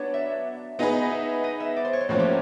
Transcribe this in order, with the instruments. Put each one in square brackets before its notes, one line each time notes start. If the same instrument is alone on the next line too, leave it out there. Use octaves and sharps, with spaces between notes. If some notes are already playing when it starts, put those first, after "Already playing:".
Already playing: [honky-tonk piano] F#3 B3 D4 [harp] C#5
[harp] E5
[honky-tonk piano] B3 D#4 G#4 B4 [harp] D#5
[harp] E5
D#5
E5
D5
C5
C#5
C5
[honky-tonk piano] A2 F3 A#3 C#4 [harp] F#4
[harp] G4